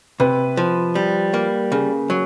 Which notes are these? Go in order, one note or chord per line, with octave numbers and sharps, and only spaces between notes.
C3 B4
F3
G3
A#3
C#3
F#3